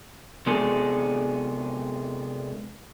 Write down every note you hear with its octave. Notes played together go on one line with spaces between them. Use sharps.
C3 G#3 B3 D4 G#4 A4